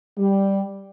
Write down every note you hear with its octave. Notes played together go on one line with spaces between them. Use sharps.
G3